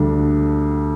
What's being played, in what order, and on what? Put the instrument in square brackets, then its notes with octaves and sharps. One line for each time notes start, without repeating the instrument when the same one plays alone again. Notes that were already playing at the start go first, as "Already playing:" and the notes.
Already playing: [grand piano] D2 D3 G3 D4